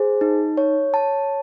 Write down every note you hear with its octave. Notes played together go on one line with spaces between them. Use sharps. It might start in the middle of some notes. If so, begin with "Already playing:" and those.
Already playing: G#4 C5
D#4
C#5
A5